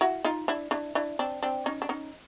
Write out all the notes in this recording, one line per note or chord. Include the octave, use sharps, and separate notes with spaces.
E4 F#4
D#4 F4
D4 E4
D4 E4
D4 E4
C4 D4
C4 D4
C#4 D#4
D4
C#4 D#4